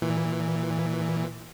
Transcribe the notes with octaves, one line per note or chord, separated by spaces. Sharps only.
A#2 E3